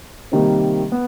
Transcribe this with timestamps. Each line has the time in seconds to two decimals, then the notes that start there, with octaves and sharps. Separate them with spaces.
0.32 C3 D#3 G3 A#3
0.92 B3